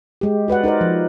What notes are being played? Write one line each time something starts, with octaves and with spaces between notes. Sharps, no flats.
G#3 G4
F#4 B4 D5 F#5
D#4 A#4 C5 D5
F3